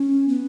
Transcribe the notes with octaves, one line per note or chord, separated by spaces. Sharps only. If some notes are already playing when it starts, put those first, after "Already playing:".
Already playing: C#4
B3